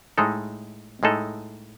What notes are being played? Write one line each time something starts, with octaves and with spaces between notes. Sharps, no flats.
A2 G#3 D#4 A4
A2 G#3 D#4 A4